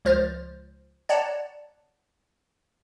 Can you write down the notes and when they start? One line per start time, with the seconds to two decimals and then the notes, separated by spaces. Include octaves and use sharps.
0.05 C#2 F3 C5 F6 A6
1.09 C#5 D5 F#5 A5 A#5